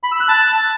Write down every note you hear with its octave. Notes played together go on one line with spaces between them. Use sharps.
B5
E6
F#6
A5